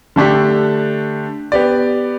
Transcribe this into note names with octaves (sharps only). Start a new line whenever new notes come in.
D3 A3 D4 G4
B3 G4 D5